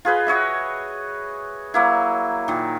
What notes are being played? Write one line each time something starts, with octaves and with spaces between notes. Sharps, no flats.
F4 G#4 B4 D#5
F#4 C#5 D#5 E5
F#3 A#3 E4
A#2 D#3